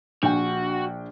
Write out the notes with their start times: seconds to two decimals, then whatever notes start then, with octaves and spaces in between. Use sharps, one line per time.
0.23 A#1 D4 F#4 G5